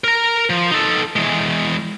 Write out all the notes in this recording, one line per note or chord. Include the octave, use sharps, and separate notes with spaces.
A#4 A#5
F3
D#4 A4
E3 G#3